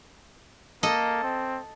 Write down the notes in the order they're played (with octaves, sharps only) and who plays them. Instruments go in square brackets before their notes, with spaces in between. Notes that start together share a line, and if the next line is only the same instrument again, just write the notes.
[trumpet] A#3 [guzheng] A4 D#5
[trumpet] C4